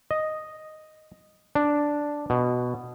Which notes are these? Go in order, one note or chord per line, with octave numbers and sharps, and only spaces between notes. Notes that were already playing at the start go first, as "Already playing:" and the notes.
D#5
D4
B2